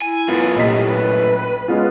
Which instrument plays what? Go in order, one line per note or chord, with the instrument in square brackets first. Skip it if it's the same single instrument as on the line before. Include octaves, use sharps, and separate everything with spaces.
[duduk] E4 [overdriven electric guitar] G#5
[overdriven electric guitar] F#2 A2 [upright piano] B3 F4
[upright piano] A#1 D#5 B6 [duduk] C3
[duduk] B4
[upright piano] G#3 B3 F4 [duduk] C#4